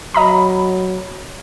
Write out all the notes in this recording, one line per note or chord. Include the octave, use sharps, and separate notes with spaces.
F#3 D#5 A#5 B5